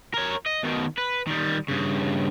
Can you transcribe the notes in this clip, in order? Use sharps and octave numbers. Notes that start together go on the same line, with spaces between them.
A#4 C#5
D#5
B2 D#3
B4
D#3 G3
G2 C#3